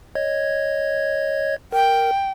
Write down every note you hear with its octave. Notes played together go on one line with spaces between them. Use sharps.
C#5 D#5 G#6
A#4 G5